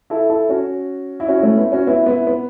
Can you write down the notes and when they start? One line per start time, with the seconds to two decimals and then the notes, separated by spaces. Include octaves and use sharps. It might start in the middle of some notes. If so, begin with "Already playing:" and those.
0.10 E4 A4
0.30 E4 A4
0.49 C#4 F#4
1.20 E4
1.28 C#4 F#4
1.38 E4
1.43 A3 C#4
1.57 B3 E4
1.72 C#4 F#4
1.87 B3 E4
2.06 B3 E4
2.27 B3